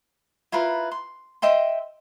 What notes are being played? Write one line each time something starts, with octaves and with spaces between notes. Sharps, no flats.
E4 F4 A#4 B4
C6
D#5 E5 G5 C6